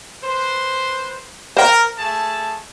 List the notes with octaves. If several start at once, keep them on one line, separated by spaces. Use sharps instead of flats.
B4 C5
A#4 C5 G5
A3 G#4 A5